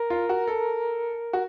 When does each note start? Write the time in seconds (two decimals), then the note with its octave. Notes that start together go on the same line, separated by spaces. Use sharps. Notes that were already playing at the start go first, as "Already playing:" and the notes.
Already playing: A#4
0.10 F4
0.29 F#4
0.48 A4
1.33 F#4